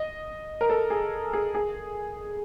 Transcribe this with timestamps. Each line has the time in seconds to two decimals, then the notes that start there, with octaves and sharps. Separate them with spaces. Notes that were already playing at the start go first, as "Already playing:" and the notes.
Already playing: D#5
0.61 A#4
0.70 A4
0.90 G#4
1.33 G#4
1.55 G#4